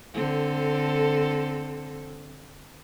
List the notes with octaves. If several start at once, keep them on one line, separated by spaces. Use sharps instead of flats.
D3 C4 A4